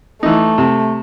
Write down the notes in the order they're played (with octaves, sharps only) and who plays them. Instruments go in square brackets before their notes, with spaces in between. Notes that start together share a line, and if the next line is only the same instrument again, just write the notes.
[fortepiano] E3 D#4 [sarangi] A3
[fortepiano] C3